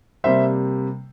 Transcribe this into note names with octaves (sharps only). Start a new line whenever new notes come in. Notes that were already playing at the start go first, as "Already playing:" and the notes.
C3 G3 A#3 C5 E5